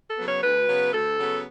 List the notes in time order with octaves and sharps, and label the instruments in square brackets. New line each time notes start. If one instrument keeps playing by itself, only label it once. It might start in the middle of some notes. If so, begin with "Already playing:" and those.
[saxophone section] A4
C#3 F#3 B3
C#5
D2 B4
C#3 F#3 B3
D2 A4
C#3 F#3 B3